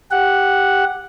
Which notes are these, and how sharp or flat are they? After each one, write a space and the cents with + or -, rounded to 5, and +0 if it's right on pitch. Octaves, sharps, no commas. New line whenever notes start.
G4 +0 F#5 +0